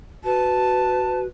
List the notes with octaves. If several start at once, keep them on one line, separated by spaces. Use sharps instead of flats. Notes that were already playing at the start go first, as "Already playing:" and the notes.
F#4 B4 A5